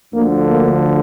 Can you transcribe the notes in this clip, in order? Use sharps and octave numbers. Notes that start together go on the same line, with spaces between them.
D2 D3 F3 A#3
A#3